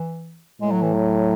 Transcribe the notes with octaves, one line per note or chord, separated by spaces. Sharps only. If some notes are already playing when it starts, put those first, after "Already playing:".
Already playing: E3
A2 G#3
F#3
E3
F#3